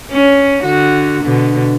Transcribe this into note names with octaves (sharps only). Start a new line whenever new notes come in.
C#4
D3 F#4
B2 D3